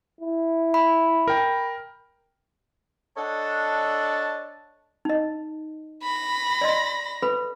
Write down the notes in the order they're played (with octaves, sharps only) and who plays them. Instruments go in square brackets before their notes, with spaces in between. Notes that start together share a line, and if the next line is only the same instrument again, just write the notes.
[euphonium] E4
[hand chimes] B5
[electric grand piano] A#4 G5
[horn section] D4 A4 C#5 D#5 F#5 A5
[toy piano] D#4 D#5
[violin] B5 A#6
[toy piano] D5 D#5 C6
A4 B4 B5